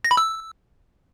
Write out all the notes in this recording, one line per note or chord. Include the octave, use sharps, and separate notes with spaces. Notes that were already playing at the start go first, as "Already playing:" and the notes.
A#6
B5
E6